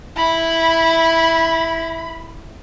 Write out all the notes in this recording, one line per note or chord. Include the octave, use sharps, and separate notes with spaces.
E4 B5